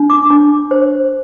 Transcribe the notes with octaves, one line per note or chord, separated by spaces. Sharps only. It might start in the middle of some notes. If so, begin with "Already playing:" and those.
Already playing: D4
D6
D4
C5